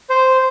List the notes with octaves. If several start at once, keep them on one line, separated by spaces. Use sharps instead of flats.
C5